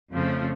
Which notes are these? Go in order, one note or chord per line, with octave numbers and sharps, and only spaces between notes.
F2 C#3 F3 A3